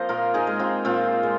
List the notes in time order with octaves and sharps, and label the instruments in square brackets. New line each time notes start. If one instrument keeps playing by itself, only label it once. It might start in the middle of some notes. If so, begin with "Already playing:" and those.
Already playing: [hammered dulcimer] F3 A#3 C4 C5 D#5 F5
A#2 F4 A#4
D#4 G#4
G#3
C4 F4
A#2 C4 F4
G#3